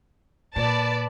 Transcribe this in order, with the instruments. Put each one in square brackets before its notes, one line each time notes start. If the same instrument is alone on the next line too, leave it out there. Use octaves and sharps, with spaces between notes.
[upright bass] A#2 [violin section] B4 D5 A5